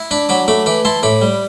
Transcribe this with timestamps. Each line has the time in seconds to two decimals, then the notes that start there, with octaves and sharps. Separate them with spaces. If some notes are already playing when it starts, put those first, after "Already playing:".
Already playing: E4
0.11 D4 B5 D6
0.29 F#3 B5 D6
0.48 A3 B5 D6
0.66 E3 B5 D6
0.85 E4 A5 C6
1.03 A2 B5 D6
1.22 G3